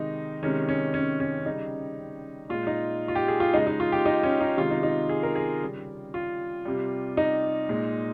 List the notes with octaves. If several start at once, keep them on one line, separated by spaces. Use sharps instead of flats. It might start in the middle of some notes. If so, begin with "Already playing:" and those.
Already playing: C3 D#3 G#3 D#4
C3 D#3 G#3 C#4
C#4
C#4
C#4
C#3 G3 D#4
A#2 G#3 F4
D#4
F4
G4
G#4
F4
C#3 G#3 D#4
D#4
F4
G4
D#4
C#4
D#4
C3 D#3 G#3 F4
D#4
D#4
G#4
A#4
G#4
C#3 G3
F4
C3 G3
D#4
A#2 G#3